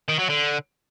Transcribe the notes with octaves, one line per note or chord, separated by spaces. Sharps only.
D#3
F#3
D3